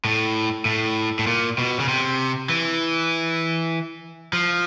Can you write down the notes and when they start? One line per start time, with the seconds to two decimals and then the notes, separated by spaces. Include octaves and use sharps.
0.05 A2
0.65 A2
1.19 A2
1.27 A#2
1.58 B2
1.79 C#3
1.88 C3
2.49 E3
4.33 F3